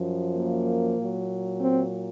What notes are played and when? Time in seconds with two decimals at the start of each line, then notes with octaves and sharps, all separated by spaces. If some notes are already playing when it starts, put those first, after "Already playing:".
Already playing: F#2 F3
0.35 A#3
0.98 A#2 F#3
1.61 C4